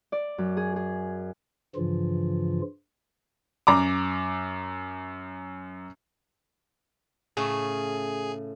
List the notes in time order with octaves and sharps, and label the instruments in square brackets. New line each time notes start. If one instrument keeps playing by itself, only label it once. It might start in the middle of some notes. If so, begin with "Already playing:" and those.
[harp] D5
F#2
G#4
G#4
[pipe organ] G2 C#3 E3 F3 F4
[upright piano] F#2 A#5 D6
[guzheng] A2 C#3 A3 [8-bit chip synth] G#4